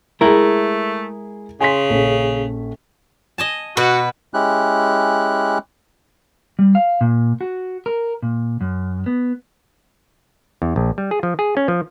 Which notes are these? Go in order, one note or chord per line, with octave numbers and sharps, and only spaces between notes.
G#3 A3 E4 G#4 A#4
C#3 G#5 C6 B6
A#1 C#4 A4
D#5 G#5 A5
B2 F#4 B4
G#3 C#4 E4 G4 F#6
G3
F5
A#2
F#4
A#4
A#2
F#2
B3
E2
A#1
G3
G#4
F3
G#4
C#4
F3